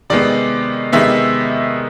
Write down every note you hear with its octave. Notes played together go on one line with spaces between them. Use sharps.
C3 D#3 G#3 B3 D5
C3 D#3 G#3 B3 E5